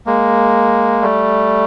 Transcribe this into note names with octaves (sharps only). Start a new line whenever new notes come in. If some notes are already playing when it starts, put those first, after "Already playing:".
G#3 A#3
G3 A3